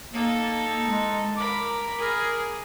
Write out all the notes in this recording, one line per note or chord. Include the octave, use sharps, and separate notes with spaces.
A#3 D#4 A4
G#3
A#4 B5 D6
G#4 A#4